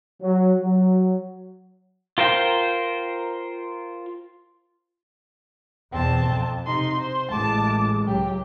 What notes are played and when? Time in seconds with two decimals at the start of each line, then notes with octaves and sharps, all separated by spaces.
0.22 F#3
0.62 F#3
2.18 F4 A#4 C5 G5
5.92 E2 B2 C4 A5
6.24 F2
6.65 C3 D#4 C6
7.00 C5
7.31 A1 G#3 A5 D6
8.07 C#2 F#3 G4